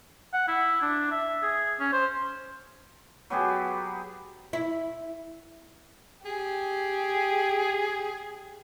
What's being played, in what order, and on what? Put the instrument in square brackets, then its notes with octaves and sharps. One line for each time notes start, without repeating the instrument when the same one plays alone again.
[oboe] F#5
E4
D4
E5
G#4
C#4
C5
[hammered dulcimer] F#3 B3 G4 G#4
[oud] E4
[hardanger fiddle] G4 [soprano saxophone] G#4